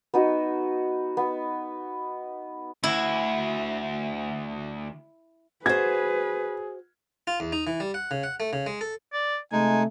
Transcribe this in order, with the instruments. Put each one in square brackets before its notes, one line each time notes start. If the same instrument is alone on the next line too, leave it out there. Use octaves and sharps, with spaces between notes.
[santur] B3 D#4 F#4
B3
[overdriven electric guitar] D2 F#4 [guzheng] E4
[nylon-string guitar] F#4 C5 [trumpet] G#4 [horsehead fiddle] B4 [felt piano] G#6
[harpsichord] F4
E2
D#4
E3
G3
F#5
C#3
F#5
A3
C#3
G#3
A4
[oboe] D5
[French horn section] C3 A3 [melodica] G#3 D#4 [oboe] G#5